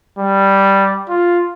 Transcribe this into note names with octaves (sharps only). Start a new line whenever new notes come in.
G3
F4